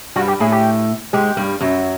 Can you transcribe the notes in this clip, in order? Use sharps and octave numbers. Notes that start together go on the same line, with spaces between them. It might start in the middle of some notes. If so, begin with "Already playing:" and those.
G2 G3 F#4
G4
A2 A3 G#4
G4
G#2 G#3 G4
G2 G3
F#2 F#3